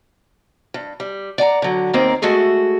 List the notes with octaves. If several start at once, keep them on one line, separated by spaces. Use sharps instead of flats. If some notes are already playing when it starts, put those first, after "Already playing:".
G2
G3
D5 F#5 G#5 A#5
D3 F#3
D#2 D#3 A#3 C4
G#3 A3 F#4 G#4 A4